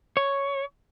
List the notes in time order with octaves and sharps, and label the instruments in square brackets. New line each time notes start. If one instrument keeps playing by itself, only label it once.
[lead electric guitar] C#5